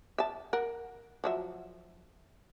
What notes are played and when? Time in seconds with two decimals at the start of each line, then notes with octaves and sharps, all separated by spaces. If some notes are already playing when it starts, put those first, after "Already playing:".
0.18 E5 A5
0.53 A#4 F#5
1.24 F3 F#3 E5